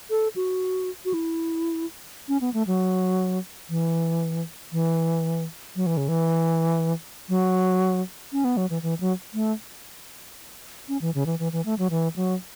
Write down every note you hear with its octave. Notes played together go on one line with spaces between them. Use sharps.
A4
F#4
F#4
E4
C#4
B3
A3
F#3
E3
E3
F#3
E3
C#3
E3
F#3
C#4
B3
F#3
E3
E3
F#3
A3
C#4
E3
C#3
E3
E3
E3
A3
F#3
E3
F#3